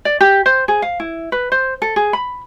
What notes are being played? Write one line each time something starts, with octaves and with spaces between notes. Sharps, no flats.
D5
G4
C5
G#4
F5
E4
B4
C5
A4
G#4
B5